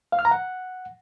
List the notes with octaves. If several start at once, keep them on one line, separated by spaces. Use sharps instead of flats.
F5
F6
A#5
F#5